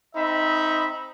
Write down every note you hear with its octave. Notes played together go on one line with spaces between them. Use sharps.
C4 D#4 D#5 E5 B5